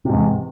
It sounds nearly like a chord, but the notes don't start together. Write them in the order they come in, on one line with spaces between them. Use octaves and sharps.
C3 G#2 E2